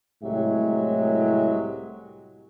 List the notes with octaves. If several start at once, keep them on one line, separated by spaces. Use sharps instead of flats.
C2 A2 F#3 G#3 G4 E5